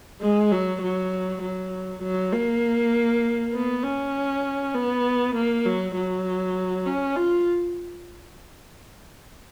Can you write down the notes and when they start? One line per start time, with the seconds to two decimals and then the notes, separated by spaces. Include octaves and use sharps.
0.21 G#3
0.51 F#3
0.82 F#3
1.42 F#3
2.03 F#3
2.33 A#3
3.54 B3
3.83 C#4
4.75 B3
5.35 A#3
5.66 F#3
5.96 F#3
6.87 C#4
7.17 F4